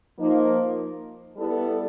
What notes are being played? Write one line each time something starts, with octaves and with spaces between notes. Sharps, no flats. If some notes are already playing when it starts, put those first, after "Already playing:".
F3 A#3 D#4
G3 B3 E4 A4 D5